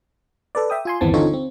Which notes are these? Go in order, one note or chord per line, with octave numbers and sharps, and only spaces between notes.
A4 B4 D5
E5 G5 D#6
F4 G#5 C6
G1 D#2 E3 B3 C4 A5
D3 C4 D#4 F4 A4 C#5
C4